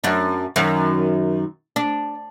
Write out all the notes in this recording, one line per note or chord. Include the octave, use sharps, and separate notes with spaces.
F#2 D4
F#2 D#3
D4